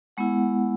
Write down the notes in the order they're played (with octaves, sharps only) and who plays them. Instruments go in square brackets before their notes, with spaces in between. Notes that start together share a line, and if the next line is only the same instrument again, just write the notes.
[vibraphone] G#3 B3 E4 F#5